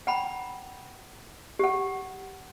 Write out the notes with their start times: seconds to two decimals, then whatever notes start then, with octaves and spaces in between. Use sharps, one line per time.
0.07 F#5 G5 A#5 B5
1.59 G4 F#5